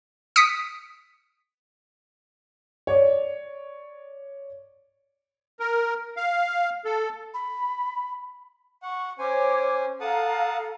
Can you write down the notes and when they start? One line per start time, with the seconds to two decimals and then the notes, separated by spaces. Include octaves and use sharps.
0.36 D#6 B6 C#7 D7
2.87 C#5 D5
5.60 A#4
6.17 F5
6.85 A4
7.34 B5
8.83 F#5 C#6
9.19 C#4 C5 C#5 G#5 D6
10.00 A4 F5 F#5 A5 A#5 D#6